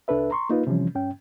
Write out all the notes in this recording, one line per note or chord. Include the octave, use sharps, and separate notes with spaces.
C2 D4 A4 B4 E5
A#5 C6 C#6
A#3 D#4 F4 B4
C3 E3 F3 G3 C#4
G2 C#4 G5